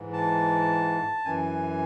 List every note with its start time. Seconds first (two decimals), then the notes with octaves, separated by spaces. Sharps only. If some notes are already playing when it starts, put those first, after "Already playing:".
Already playing: G#2 E3
0.13 A5
1.25 F#2 E3 G#5